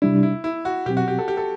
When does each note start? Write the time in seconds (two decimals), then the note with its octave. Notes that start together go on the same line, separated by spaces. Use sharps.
0.02 C3 G3 D4 E4
0.23 E4
0.44 E4
0.65 F#4
0.86 B2 F#3 C4 G4
0.97 F#4
1.08 G4
1.19 A4
1.28 G4
1.37 A4